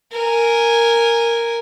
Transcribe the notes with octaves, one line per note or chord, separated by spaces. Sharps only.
A#4 G#5